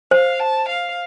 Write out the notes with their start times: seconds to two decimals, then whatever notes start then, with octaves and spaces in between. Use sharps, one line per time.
0.11 C5 F5
0.40 A5
0.68 F5